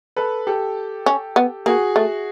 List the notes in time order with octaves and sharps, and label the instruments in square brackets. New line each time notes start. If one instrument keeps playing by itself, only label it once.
[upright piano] A4 B4
G4 A4
[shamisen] C#4
B3
[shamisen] A#3 [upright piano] F#4 G#4
[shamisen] A3